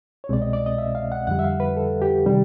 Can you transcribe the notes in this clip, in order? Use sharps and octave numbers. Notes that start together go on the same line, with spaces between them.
C#5
C2 B2 G#3 C4 D5
D#5
D5
D#5
E5
F5
F#5
F2 D3 G3 F#5
E5
F5
B4
A4
G4
C3 D#3 G3